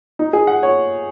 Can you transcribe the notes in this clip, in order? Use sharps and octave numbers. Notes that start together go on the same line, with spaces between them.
D#4
G#4
F#5
C#5